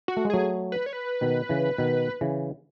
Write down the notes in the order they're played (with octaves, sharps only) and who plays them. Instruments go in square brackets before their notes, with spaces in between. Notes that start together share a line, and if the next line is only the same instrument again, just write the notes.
[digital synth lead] F#4
[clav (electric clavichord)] A3
G#3
[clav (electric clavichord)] F#3 A3 [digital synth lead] G#4
[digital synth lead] B4
C#5
B4
[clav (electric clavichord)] B2 D#3
C#3 E3
B2 D#3
C#3 E3